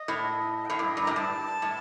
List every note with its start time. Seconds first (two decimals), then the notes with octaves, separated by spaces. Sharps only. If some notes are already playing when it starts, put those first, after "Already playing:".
Already playing: D#5
0.08 A2
0.65 G5
0.70 A2 F5
0.79 G2
0.85 D#5
0.97 G2 A#5
1.07 A2
1.11 G5
1.16 G2 A5
1.62 A2